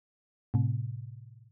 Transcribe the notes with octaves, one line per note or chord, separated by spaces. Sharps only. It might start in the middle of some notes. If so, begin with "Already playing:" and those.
A2 C3